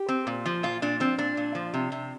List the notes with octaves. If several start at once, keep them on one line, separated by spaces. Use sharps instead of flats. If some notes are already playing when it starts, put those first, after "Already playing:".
Already playing: G4
C4
A#2
F3
A#2 F4
A#2 D4
F3 C4
A#2 D4
A#2
F3
C3
C3